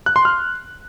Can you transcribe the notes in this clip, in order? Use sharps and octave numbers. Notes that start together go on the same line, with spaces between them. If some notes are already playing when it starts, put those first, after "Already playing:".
F#6
C6
F6